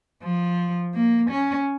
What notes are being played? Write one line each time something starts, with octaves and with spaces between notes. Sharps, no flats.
F3
A#3
C#4